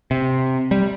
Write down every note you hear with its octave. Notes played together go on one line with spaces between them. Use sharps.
C3
G3